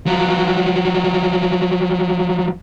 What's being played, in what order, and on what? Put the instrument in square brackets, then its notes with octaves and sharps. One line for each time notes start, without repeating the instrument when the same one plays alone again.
[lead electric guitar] F3 F#3